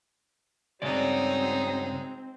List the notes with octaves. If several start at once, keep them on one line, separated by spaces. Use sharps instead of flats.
G2 C#3 G#3 C4 D#4 F#4 C#5 D5